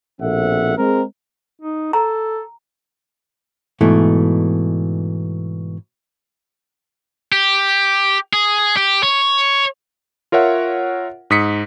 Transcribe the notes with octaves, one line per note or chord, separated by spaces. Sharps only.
A#1 B2 C4 A4 E5 F#5
G#3 C4 A#4
D#4
A4 A#5
G#2 B2 E3 A3
G4
G#4
G4
C#5
F4 A#4 C#5 E5 F#5
G#2 D#6 B6 C#7